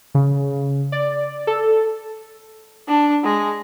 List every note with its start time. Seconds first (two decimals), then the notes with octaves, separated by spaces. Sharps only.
0.15 C#3
0.92 D5
1.47 A4
2.88 D4
3.24 G#3